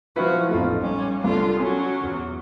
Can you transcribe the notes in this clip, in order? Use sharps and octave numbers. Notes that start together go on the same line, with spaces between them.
F3 E4 F#4 B4
A1 F2 A3 B3 D#4 F4
G3 C#4
C2 D3 F4
F#3 C#4
E2